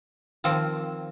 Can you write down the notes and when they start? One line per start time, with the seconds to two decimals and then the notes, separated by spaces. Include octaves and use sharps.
0.44 D#3 F3 A#3 C4